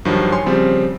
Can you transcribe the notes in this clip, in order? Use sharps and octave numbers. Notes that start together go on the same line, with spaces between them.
G2 D#3 F3 F#3
C#5 G#5 C6
C#3 F3 G3 C4